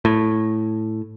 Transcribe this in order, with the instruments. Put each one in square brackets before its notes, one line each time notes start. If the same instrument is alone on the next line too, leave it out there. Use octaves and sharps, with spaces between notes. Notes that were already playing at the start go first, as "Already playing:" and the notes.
[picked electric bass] A2